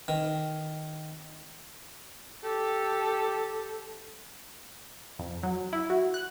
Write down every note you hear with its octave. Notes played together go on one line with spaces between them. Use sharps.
D#3
G4 A4
F2
F#3
E4
F#4
F#6